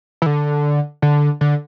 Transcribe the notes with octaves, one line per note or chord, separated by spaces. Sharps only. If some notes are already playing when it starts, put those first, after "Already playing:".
E3
D3
D3
D3